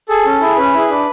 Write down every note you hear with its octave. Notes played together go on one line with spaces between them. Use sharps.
G#4 A4
C#4
E4 G#4
C#4 B4
E4 G#4
D4